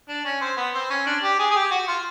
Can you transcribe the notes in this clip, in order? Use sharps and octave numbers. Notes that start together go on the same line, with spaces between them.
D4
C#4
C4
B3
C4
C#4
D4
G4
G#4
G#4
G4
F#4
F4